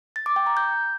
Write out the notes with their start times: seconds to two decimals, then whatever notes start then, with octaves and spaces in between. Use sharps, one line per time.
0.16 A6
0.26 D6
0.36 G5
0.46 A#5
0.57 G6